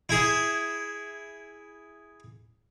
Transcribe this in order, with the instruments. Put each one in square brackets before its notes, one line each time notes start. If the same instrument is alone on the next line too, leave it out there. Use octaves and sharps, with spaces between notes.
[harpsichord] E4 G#4